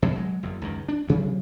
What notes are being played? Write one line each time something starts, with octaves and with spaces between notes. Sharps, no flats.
B2 F3 F#3 B3
F#3 G#3
F#1 E2
C#2 F#2 D#3
D4
D2 C3 F#3